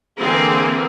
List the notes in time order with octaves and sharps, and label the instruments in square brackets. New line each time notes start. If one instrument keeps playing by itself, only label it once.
[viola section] D3 E3 A#3 C4 G#4